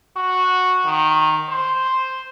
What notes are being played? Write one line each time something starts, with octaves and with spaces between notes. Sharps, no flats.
F#4
D#3
C5